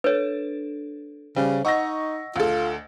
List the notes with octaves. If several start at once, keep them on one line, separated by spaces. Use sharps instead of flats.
D4 A4 B4 C#5
C#3 G3 C5
D#4 D#5 F#5 C#6 E6 A#6
D2 F4 A4